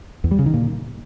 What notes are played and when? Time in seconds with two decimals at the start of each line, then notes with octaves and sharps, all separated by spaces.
0.24 E2
0.31 G3
0.39 C#3
0.46 D#3
0.54 A#2